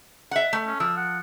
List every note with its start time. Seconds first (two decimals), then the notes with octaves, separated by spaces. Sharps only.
0.31 E5 F#5
0.53 A3
0.67 C#4
0.80 F3 E6
0.97 F#5